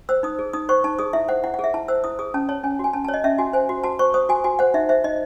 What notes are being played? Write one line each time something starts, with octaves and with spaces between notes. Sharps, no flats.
C5 E6
D#4 D#6
G#4
D#4 D#6
C5 C#6
D#4 A5
G#4 D#6
E4 E5
C5 F#5
E4 F#5
G#4 F#5
E5
E4 A5
C5 E6
E4 D#6
G#4 D#6
C#4 A5
C#5 A5
C#4 G#5
F#4 G#5
C#4 A5
C#5 A5
D#5
C#4 E5
F#4 G#5
C5 G#5
F#4
F#4 A5
C5 C#6
C5 D#6
F#4 G#5
F#4 G#5
C5 F#5
D#4 E5
C5 E5
D#4 D#5